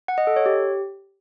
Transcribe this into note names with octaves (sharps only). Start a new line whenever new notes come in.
F#5
D#5
A4
C#5
G4